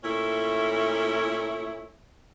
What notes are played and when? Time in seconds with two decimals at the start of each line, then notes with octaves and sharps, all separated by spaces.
0.04 A#2 A3 C#4 E4